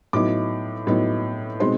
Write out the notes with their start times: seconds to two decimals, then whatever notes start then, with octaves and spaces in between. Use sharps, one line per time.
0.13 A2 F#3 B3 D#4 D6
0.87 A2 F#3 B3 D#4
1.60 B2 G#3 C4 D#4 C6